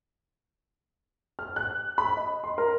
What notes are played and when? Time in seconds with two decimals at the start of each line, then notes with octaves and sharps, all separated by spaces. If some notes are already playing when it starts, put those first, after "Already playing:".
1.39 F6
1.56 F#6
1.98 B5
2.17 D#5
2.44 C6
2.58 A#4